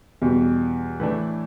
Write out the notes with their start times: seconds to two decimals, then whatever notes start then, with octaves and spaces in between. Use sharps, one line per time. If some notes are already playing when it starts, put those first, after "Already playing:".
0.22 E2 B2 G3
1.00 A2 E3 A3 D4 B4